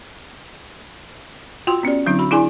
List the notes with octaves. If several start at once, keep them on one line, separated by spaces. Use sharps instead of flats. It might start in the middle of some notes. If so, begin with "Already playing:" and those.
F4 F#4 G5 C6
B3 C#4 G4 D5
D3 F#3 C4 D4 E4
F#4 B5
D4 E4 G#4 D5 G#5 C6